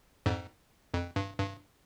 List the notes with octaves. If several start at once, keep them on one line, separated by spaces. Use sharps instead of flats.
F2 G#2
F2
G2
G2